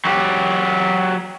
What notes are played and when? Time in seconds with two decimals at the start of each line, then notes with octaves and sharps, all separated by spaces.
0.05 F#3 G4